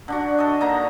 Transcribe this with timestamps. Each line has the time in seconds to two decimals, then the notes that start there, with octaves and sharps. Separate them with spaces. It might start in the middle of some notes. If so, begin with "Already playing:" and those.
0.08 D3 D4 F#4
0.38 A4 D#5
0.61 D3 A#3 D#4 A#5